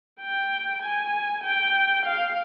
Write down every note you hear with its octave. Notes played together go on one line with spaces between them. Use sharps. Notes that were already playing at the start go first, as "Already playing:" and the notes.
G5
G#5
G5
F5